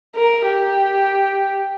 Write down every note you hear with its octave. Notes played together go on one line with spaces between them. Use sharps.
A#4
G4